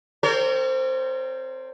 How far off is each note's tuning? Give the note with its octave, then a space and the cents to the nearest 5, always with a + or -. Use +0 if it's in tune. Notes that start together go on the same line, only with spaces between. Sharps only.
C4 +0 A#4 -40 C#5 +35